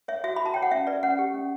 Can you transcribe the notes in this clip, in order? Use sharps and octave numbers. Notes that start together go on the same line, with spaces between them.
C#5 E5
F#4 E5
F#4 B5
A5
C#5 G5
F#5
C#4 E5
B4 D5
C#4 F#5
G4
C#4